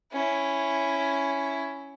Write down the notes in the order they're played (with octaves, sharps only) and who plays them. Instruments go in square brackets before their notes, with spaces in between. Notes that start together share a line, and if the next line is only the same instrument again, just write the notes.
[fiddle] C#4 E4